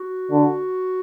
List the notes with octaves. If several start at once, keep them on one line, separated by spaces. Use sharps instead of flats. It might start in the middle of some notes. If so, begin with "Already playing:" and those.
Already playing: F#4
D3